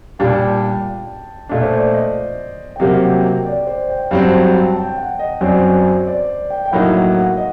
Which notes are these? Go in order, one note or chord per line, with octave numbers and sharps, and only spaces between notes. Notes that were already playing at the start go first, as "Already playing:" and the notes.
A#2 G3 D4 G5
A5
G5
A#2 A3 D4 D#5
C5
D5
D#5
G5
C3 F#3 A#3 F#5
G5
G5
D5
C5
G5
G2 F#3 C4 A5
G5
A5
G5
F#5
D#5
F#2 F#3 C4 D5
C5
D5
G5
G5
A2 F#3 A#3 D#4 F#5
F#5
F#5
D#5